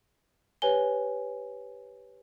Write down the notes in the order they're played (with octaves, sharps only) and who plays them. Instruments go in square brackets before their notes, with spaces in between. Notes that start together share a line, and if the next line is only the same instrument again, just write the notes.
[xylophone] G4 B4 C#5 G#5 G7